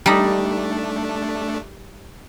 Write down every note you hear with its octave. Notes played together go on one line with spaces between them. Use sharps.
G3 A3 D4 D#4